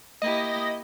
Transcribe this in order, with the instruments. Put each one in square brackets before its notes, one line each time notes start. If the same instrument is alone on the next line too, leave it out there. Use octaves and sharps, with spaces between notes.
[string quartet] A#3 E4 G4 [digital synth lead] D#5